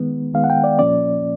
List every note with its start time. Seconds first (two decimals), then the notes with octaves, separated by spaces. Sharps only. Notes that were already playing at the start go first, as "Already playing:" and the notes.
Already playing: D#3 G#3 B3
0.34 D#3 G#3 B3 F5
0.44 F#5
0.50 G5
0.64 D5
0.79 A#2 F3 A#3 C#4 D5